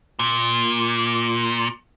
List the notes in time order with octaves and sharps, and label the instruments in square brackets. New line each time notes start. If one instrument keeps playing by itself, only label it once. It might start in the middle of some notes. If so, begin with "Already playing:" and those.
[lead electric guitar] A#2